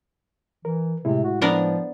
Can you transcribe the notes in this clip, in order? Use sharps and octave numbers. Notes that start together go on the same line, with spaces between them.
E3 A#4
A2 C3 G#3 E4
F#4
F3 B3 D4 A#4